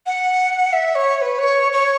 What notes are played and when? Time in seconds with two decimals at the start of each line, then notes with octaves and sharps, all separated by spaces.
0.06 F#5
0.73 E5
0.95 C#5
1.17 C#5
1.22 B4
1.39 C#5
1.72 C#5